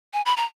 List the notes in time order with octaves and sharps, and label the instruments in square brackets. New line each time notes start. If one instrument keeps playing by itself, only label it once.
[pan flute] G#5
B5
A#5